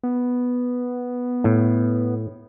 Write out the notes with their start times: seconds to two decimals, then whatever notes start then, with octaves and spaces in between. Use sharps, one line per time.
0.03 B3
1.44 A2